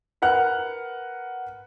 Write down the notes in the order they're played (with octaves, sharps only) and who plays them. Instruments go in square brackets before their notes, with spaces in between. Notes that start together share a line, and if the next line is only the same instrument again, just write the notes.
[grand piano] A#4 B4 F#5 F6 F#6